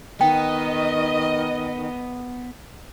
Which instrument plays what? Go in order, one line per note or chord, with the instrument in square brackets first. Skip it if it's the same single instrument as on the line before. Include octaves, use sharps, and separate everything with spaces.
[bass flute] D#3 [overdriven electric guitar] B3 [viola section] D#5 [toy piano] G5